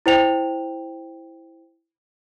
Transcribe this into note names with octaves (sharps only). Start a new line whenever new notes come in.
E4 C5 G5 F7